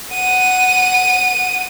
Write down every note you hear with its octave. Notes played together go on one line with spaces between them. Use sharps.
F#5 D#7